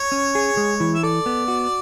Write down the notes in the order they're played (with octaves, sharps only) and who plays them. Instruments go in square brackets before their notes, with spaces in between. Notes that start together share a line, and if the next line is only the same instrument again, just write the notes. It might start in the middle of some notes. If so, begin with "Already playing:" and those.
Already playing: [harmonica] C#5
[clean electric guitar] C#4
G#4
G#3
E3
[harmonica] E5
[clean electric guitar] A4 [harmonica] D5
[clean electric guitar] B3
F#4